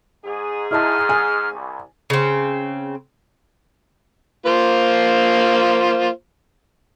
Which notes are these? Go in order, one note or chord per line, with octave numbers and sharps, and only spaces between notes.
G#2 G#4
G#2 E4 D#5 A5 F6
G#5
C2
C#3 C4
A#3 F4 C5